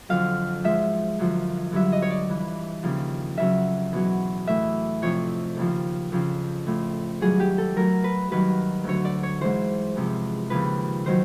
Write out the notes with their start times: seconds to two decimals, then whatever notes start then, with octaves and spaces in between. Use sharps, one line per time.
0.09 F2 D3 F#3 F5
0.64 G#2 F3 E5
1.19 F#2 D3 F3
1.72 G2 D3 F#3 E5
1.92 D#5
2.02 C#5
2.10 D5
2.29 G2 E3
2.83 D#2 C#3 F3
3.38 F2 C#3 F#3 E5
3.93 E2 B2 F#3
4.47 A2 E3 E5
5.02 F2 C3 F3 C#5
5.57 D#2 C#3 F3
6.12 F2 C#3 F3
6.67 A2 F3
7.21 G2 D#3 F#3 G#4
7.40 G4
7.58 A4
7.76 A2 F#3 A#4
8.04 B4
8.31 G2 D#3 F#3 B4
8.84 D2 D3 F#3 C#5
9.05 D5
9.23 C#5
9.41 G#2 E3 C5
9.96 E2 C3 F3
10.50 D#2 C#3 F3 B4
11.06 D#3 F#3 C5